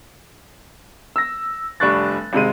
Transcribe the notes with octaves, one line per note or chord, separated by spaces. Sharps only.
E6 A#6
F1 G3 D4 C#6 F#6 A6
G#1 C3 G#3 D#7